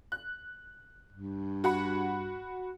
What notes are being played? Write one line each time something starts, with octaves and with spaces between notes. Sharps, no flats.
F#6
G2
F#4 F#5 B5